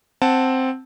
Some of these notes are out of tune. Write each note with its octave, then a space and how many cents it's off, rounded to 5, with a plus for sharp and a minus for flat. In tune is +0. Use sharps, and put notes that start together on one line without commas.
C4 +0 F#5 +0 A5 +0